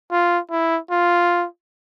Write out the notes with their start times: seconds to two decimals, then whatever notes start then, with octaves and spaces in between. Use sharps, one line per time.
0.11 F4
0.51 E4
0.91 F4